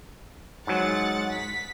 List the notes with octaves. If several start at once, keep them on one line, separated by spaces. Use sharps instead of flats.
G#2 F#3 G#3 F#5 A6
B6